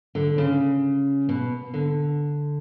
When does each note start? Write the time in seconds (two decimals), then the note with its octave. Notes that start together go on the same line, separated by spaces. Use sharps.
0.15 D3
0.38 C#3
1.29 B2
1.74 D3